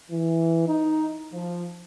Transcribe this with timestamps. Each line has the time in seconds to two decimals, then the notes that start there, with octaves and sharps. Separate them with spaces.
0.11 E3
0.68 D#4
1.33 F3